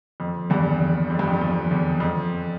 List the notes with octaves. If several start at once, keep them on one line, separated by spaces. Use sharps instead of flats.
F2
E2 G2
E2
F2
G2
F2
F2
E2
F2